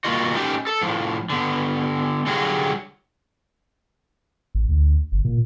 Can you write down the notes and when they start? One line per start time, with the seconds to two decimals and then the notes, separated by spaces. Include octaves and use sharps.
0.04 G3 A#3 F4 F#4 D#5
0.34 A3 C#4 D#4 G4
0.67 A4
0.82 A2 F3
1.30 D3 B3
2.26 D3 F#3 G3 F4 F#4 G#4
4.55 A1
4.69 D2
5.12 G1
5.25 A#2